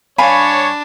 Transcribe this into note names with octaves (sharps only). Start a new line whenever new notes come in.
G2 D4 C#5 F5 G#5 B5